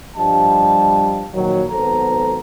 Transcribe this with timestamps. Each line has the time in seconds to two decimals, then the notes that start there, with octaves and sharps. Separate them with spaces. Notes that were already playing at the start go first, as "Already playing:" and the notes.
0.16 G2 F3 G3 D#5 A5
1.33 A#2 D#3 F3 F#3
1.70 G#1 F#3 B3 A4 C5 A#5